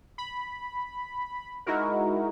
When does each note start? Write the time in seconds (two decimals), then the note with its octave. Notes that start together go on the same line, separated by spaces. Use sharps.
0.18 B5
1.66 G#3 D#4 E4 F#4 A#4